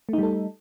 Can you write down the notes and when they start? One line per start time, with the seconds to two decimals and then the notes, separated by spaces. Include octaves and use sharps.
0.09 A3
0.13 D#4
0.18 G3
0.23 A4